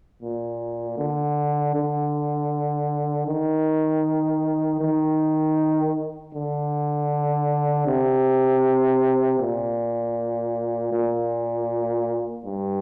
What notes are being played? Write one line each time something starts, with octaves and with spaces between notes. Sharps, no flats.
A#2
D3
D3
D#3
D#3
D3
C3
A#2
A#2
G2